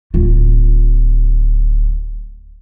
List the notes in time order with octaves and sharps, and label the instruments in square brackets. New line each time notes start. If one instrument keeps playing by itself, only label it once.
[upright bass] D1 F4